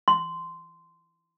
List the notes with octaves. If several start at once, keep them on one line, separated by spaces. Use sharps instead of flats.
C6